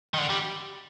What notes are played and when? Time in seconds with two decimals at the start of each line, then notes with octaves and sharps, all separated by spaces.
0.14 D#3
0.18 D3
0.30 G3